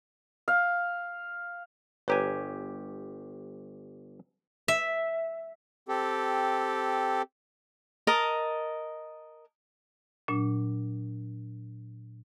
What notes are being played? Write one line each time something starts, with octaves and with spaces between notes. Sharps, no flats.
F5
G1 G4 B4 C#5 G#5 A#5
E5
C4 G4 A4
A#4 D#5 A5
A#2 F#3 D4